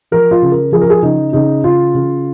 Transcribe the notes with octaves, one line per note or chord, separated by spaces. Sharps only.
F3 A#4
F4
C#3
A#4
F3 G#4
A#4
G#4
C#3 D#4
C#3 D#4
C#3 F4
C#3